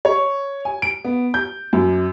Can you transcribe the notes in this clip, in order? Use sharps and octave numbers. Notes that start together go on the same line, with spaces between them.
C#5
G#5
D7
B3
G6
F#2